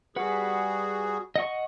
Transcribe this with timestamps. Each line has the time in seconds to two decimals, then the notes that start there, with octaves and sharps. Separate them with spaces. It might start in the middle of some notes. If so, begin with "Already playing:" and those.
0.16 G3 F#4 G#4 B4 F#5
1.36 D#5 F#5 C#6